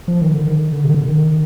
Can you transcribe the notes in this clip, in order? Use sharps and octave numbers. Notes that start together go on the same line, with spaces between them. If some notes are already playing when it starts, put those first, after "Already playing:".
F3
D#3
D3
D#3
D3
C3
D#3
D3
D#3